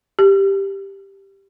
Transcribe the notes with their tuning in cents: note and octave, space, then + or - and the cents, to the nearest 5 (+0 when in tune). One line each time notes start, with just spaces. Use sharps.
G4 +0